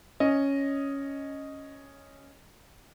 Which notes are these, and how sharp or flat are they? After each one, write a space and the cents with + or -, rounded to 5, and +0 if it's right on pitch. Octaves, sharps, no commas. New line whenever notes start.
C#4 +0 D#5 +0